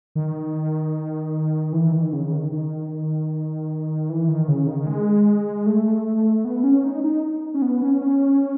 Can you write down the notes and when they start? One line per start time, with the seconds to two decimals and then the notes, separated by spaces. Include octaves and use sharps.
0.15 D#3
1.73 E3
1.92 D#3
2.13 C#3
2.33 D#3
2.52 D#3
4.09 E3
4.28 D#3
4.48 C#3
4.67 D#3
4.87 G#3
5.66 A3
6.45 B3
6.64 C#4
6.84 D#4
7.04 D#4
7.54 C#4
7.62 B3
7.82 C#4
8.01 C#4